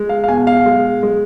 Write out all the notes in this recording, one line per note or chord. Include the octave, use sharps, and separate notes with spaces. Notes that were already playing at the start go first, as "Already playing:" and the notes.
Already playing: G#3
F5
F5
B2 G#5
F5
G#3
G#3